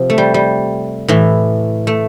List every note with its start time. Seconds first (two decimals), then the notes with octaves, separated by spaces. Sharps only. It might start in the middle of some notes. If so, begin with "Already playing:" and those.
Already playing: C3 F3
0.10 A3
0.18 G3
0.34 G3
1.08 A2 E3
1.87 A3